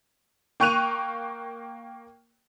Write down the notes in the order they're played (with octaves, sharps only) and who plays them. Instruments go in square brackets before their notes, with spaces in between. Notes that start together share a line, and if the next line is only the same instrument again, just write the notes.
[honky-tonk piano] A#3 G5 C#6 F#6 D#7 F7